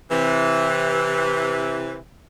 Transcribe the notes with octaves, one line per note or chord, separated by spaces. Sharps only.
C3 E3